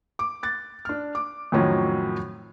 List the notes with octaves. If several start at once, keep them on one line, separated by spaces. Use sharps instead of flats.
D6
F#6 A6
D4 F6
D6
F2 A2 D#3 F3 F#3 C#4